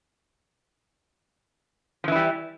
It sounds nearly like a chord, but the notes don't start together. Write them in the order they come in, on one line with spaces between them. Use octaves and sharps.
F3 E3 E4 G3